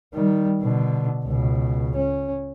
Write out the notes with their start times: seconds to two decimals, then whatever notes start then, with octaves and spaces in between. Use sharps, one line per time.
0.13 D#3 G3
0.61 B2 D3
1.25 C#2 B2
1.95 C#4